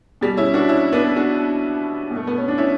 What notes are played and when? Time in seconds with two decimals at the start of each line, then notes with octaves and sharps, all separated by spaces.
0.21 B2 G3
0.37 C#4 E4
0.54 D4 F#4
0.69 C#4 E4
0.92 B3 D4
1.16 D4 F#4
2.11 B2
2.16 A3
2.27 B3
2.38 C#4
2.48 D4
2.58 C#4 E4